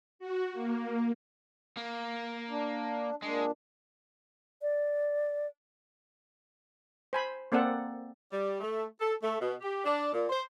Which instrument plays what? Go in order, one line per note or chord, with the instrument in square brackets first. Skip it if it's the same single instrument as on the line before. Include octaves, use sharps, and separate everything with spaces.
[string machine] F#4
A#3
[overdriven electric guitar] A#3
[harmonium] D4
[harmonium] A#2 D4 [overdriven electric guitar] G#3
[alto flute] D5
[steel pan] C5 G#5 B5
A#3 C4 A4 D5 F#5
[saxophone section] G3
A3
A4
A3
B2
G4
D4
A#2
C5